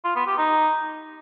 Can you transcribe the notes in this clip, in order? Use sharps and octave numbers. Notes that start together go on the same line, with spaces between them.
F4
B3
G4
D#4